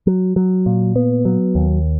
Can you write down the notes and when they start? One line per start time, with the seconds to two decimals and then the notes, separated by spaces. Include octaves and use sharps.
0.07 F#3
0.36 F#3
0.66 A#2
0.96 B3
1.25 F#3
1.55 D#2